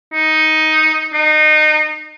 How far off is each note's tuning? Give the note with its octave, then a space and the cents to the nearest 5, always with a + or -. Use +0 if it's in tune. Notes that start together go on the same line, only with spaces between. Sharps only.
D#4 +10
D#4 -25